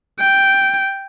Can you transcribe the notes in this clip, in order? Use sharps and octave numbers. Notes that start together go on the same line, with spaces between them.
G5